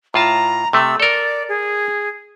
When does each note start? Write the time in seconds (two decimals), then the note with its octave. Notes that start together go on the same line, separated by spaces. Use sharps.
0.14 A2 F4 A5 A#5
0.73 C3 A3 E6
1.00 A4 A#4 D5
1.49 G#4